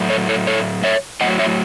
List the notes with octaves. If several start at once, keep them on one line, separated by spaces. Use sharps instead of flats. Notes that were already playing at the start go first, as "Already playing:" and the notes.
Already playing: A2 F#3 A3
A4 C#5
A4 C#5
A4 C#5
C#5 E5
A2 F#3 A3 D#5 F#5
C#5 E5